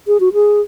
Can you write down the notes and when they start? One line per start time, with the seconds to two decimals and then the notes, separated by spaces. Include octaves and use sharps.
0.07 G#4
0.20 F#4
0.33 G#4